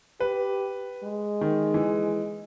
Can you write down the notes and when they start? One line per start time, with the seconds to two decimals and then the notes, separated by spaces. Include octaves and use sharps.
0.20 G4 B4
1.04 G#3
1.41 D#3
1.74 E3